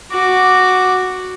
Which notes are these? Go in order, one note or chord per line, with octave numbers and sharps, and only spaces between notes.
F#4 D6